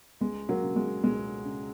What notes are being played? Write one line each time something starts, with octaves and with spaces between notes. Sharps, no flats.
C#2 G#3
F#3 A#3
C#3
G#3
C#2 G#3
C#3